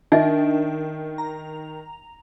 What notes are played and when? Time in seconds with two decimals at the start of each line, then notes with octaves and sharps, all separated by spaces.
0.12 D#3 D4 D#4 D#5 E5
1.18 A#5